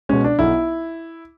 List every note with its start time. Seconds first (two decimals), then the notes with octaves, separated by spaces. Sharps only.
0.09 B2 G#3 C#4
0.24 D4
0.39 B1 E4